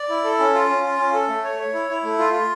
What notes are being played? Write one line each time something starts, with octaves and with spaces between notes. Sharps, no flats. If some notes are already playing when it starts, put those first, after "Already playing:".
Already playing: D5
E4
A4
C#4
F4
C#4
F4
C#4
A4
A3
C#5
C#5
E4
E4
A3
F4
F4